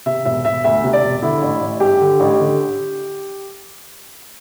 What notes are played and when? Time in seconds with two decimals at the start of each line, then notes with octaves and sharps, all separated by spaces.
0.06 C3 E5
0.25 E1 E5
0.45 E1 E5
0.64 D2 E5
0.84 C3
0.93 D5
1.03 E1
1.22 D3 E4
1.42 A1
1.61 A1
1.80 G2 G4
2.00 D3
2.20 A1
2.40 D3